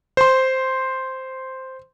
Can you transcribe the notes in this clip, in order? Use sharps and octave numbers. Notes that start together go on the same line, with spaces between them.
C5 C6